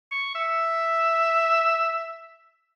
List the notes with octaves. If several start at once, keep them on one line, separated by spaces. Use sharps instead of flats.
C#6
E5